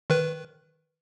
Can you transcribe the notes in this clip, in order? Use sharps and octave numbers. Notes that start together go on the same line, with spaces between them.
D#3 B4